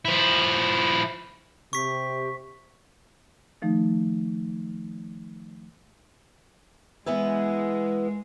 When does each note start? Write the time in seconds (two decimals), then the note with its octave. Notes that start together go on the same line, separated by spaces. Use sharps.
0.05 F3 E4
1.73 C3 G4 C#6 B6
3.62 D#3 F3 A3 D#4
7.06 E3 G#3 B3 E4